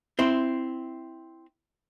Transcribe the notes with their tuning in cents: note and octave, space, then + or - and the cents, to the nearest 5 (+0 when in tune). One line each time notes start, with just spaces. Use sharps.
C4 +0 E4 +0 C6 -10